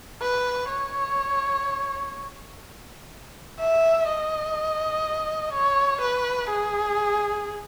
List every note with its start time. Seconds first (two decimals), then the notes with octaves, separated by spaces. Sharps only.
0.22 B4
0.70 C#5
3.59 E5
4.08 D#5
5.53 C#5
6.01 B4
6.50 G#4